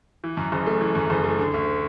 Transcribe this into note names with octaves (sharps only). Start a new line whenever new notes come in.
E3
F#2
F#1
A3
E3
F#2
F#1
A3
D3
D2